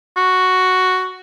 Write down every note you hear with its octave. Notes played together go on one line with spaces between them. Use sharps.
F#4